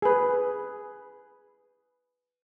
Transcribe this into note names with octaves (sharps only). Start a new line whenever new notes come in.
G#4 B4